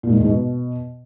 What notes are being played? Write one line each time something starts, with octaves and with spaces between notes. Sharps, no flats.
A#2
G#2
E2
G#2
B2